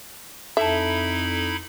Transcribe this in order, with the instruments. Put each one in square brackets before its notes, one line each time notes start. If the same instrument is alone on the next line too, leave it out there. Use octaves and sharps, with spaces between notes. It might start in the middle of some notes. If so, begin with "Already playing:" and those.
[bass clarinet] F2 [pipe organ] D#4 E4 B5 [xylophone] A4 A5 [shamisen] E5